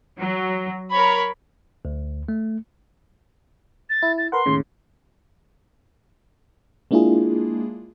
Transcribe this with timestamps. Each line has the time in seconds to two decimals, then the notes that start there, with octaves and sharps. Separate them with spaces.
0.20 F#3
0.91 A#4 C#5 B5
1.85 D2
2.29 A3
3.90 A6
4.02 E4
4.18 A6
4.32 A#4 B4 F#5 C6
4.46 D#2 A2 C#3
6.91 G#3 A#3 D4 E4 F4 G#4